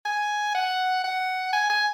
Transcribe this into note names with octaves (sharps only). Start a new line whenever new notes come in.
G#5
F#5
F#5
G#5
G#5